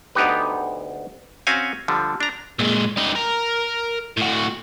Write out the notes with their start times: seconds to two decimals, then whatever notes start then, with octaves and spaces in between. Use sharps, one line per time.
0.15 D2 B3 D#4 G4 B4
1.47 C4 C#4 F#4 F5 G#5
1.88 D3 F3 G3
2.20 D4 A#5
2.59 A#2 G#3
2.97 G3 D#4
3.16 A#4
4.17 A2 F#4